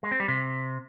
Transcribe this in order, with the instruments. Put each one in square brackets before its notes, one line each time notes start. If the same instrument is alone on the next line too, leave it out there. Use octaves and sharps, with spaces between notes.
[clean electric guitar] G#3
C4
G3
C3